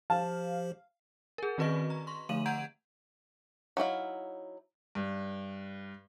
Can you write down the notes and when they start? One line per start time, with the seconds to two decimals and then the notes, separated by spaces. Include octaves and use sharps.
0.10 F3 G4 C5 F5 A5
1.38 G#4 A#4
1.58 D#3 C4 F#4 B4 D#5 C#6
1.90 A#5
2.07 C6 C#6
2.29 D3 F3 A3 F5 D#7 F#7
2.46 F#5 A#5 G6 G#6 D7
3.77 F#3 D#4 E4 F5
4.95 G2